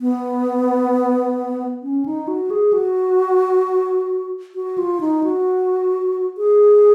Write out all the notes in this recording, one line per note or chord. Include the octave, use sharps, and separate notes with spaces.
B3
C#4
D#4
F#4
G#4
F#4
F#4
F4
D#4
F#4
G#4